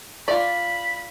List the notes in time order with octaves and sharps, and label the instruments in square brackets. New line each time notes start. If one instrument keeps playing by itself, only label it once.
[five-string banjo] F4 D5 [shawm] B5